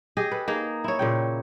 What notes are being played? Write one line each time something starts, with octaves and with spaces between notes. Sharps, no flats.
G4 G#4 D#5
A4 B4
A#3 D#4 G#4
E4 C#5
A#2 C#3 G5